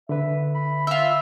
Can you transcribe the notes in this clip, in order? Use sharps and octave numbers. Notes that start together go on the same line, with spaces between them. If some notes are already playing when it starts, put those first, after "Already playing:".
D3 B4 E5
B5
F4 E5 E6